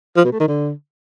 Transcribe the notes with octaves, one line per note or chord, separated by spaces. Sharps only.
F3
B2
A3
D#3
D3